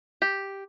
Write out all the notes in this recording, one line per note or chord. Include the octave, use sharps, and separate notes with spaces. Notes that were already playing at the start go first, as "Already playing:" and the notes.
G4